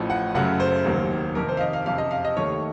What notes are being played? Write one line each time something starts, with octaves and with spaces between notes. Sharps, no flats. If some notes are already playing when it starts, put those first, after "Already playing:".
Already playing: A1 A2 F3
F#5
F#1 F#2 C#3 F#3 A3 F#5
C5
F1 D#2 D#3 F#3 A#3
F2 C3 D#3 A#4
C5
F5
D#5
F5
F#1 F2 C3 F5
D#5
F5
D#5
D#2 D#3 A3 C#5
C#5